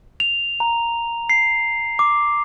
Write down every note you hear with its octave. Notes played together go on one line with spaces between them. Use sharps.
F7
A#5
C7
D6